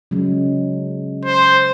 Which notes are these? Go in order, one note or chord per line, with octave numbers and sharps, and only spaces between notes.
C#3 F#3 G#3
C5